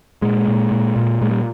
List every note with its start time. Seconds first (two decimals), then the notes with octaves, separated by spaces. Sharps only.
0.22 A#2 G#3
0.48 A#2
0.71 A#2
0.96 A#2
1.22 A#2 G#3
1.31 G3